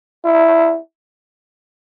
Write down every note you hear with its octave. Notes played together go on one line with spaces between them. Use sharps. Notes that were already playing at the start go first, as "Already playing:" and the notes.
E4